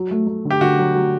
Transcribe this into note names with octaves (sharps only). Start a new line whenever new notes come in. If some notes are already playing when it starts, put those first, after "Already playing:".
Already playing: F#3
A3
A3
D3
G4
D3 F#4
F#3
F#3